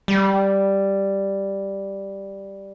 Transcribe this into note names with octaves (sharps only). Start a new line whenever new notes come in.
G3